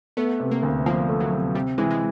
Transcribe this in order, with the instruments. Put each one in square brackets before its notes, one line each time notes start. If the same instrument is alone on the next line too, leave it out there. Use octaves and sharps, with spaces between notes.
[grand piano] A3 [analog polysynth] B3
[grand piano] C3
[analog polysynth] A#3
[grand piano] D2
[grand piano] F3 [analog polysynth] A#3
[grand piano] A3
[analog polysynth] F#3
[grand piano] C3
[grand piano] C3 [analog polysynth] G3
[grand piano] E3 [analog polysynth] G#3
[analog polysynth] G#3